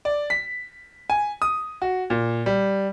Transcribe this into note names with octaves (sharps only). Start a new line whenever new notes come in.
D5
B6
G#5
D#6
F#4
A#2
G3